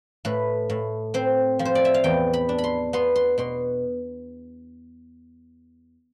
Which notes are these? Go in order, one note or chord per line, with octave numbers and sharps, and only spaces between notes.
A2 B4
A2
C4 C5
F3
C5
D5
E5
F5
E2 G5
B5
D4
B5
C6
B3 C6
C6
B2 C6